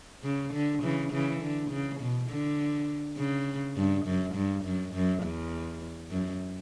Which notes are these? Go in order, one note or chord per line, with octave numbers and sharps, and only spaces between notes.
C#3
D3
C#3 E3
C#3 E3
D3
C#3
B2
D3
C#3
G2
F#2
G2
F#2
F#2
E2
F#2